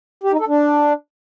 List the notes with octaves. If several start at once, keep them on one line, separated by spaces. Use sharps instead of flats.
G4
D#4
A4
D4